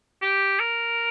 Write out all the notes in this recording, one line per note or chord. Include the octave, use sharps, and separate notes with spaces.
G4
A#4